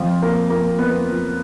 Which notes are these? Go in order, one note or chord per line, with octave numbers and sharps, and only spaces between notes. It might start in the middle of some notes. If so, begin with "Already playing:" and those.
Already playing: F2 F3 F4
A#3 A#4
F2 A#3 A#4
F2 B3 B4
F3